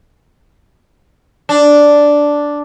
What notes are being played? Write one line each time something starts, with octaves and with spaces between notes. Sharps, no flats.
D4